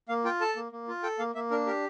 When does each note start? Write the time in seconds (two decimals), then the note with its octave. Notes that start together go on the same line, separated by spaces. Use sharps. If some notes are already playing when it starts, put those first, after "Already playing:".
0.09 A#3 F5
0.25 F4 G5
0.41 A4 A5
0.56 A#3
0.72 A#3
0.88 F4
1.03 A4 G5
1.19 A#3 F5
1.35 A#3 E5
1.50 D4 A#4
1.66 G4 A#4